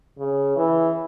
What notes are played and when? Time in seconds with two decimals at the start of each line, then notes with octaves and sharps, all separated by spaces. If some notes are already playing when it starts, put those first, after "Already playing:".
0.18 C#3
0.57 E3